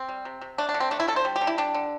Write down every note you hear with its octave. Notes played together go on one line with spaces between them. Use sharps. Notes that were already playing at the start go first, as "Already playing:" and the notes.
Already playing: C4
G3
C3
C3
A3 D4
D4
D3
C4
A3 D4
E4
D3 A4
C5
G3
G4
D3
E4
G3 D4
D3